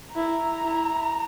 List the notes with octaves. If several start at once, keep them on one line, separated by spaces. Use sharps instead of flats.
E4 A#5
E4